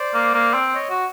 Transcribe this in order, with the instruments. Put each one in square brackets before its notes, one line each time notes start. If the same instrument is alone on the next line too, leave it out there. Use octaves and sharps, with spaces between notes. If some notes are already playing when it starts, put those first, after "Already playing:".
Already playing: [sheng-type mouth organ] C5 D5
[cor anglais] A#3
A#3
C4
[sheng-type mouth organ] C#5 D#5
[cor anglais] F#4